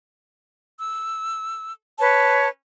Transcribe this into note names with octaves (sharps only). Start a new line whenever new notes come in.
E6
B4 C#5 A5